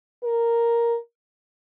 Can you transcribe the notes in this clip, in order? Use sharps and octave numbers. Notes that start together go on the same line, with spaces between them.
A#4